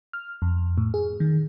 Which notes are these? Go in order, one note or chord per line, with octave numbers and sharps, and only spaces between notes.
F6
F2
A2
G#4
D#3